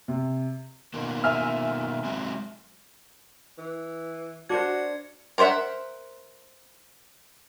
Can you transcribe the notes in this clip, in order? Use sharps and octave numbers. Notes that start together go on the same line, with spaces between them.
C3
B2 D#3 A#3
E5 G#5 F6
F#3 G#3 C4
E3
D4 F#4 A#4 C5 G#6 C#7
A#4 C5 C#5 E5 F#5